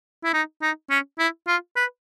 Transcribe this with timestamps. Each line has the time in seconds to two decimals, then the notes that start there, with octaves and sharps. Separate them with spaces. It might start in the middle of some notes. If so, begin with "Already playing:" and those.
0.24 E4
0.33 D#4
0.62 D#4
0.90 C#4
1.19 E4
1.48 F4
1.76 B4